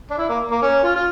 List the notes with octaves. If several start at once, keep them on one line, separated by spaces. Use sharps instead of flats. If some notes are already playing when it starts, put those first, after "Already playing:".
D4
E4
A#3
A#3
C#4
F4
F4